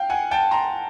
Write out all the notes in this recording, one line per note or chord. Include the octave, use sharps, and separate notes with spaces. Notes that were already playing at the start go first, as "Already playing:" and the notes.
Already playing: F5 G5
F#5 G#5
G5 A5
A#5 C6